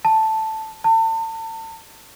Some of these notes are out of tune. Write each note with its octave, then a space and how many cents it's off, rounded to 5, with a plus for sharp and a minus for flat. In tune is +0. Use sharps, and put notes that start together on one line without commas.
A5 +0
A5 +35